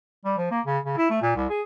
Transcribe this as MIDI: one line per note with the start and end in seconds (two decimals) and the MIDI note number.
0.25 0.33 55
0.37 0.50 53
0.51 0.61 58
0.66 0.78 49
0.85 0.97 49
0.97 1.07 64
1.10 1.17 57
1.22 1.31 46
1.36 1.47 36
1.50 1.62 68